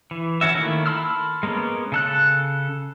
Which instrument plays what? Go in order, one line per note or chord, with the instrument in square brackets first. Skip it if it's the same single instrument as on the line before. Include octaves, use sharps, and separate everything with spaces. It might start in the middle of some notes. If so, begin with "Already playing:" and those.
[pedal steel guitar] E3
E3 C#4 F#4 E5
D#3 A3 A#3 E4
A5 B5 C6 E6 F6
G#3 A#3 B3 C#4
C#3 A4 F#6